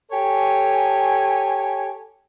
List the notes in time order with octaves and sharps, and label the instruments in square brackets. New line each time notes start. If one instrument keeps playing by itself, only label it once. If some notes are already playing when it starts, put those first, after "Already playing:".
[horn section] G4 A4 C#5 G#5